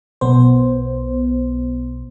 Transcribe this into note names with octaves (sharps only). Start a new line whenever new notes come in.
B1 B3 C5